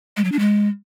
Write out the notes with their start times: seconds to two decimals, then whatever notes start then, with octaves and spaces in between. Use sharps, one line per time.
0.17 G#3
0.24 F#3
0.32 D4
0.39 G#3